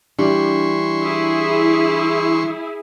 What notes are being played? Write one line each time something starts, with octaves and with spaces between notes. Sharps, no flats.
E3 G3 D4 C6 C#6
E4 G#4